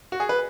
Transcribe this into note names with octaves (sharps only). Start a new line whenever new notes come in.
F#4
G#4
B4